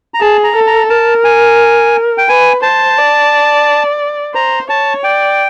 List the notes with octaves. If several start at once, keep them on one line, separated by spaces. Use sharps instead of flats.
A#5
G#4 A5
A#5
A4
A#5
A#4 A5
G#5
G5
B4 G#5
C5 A5
D5
C5 A#5
C#5 A5
D5 G5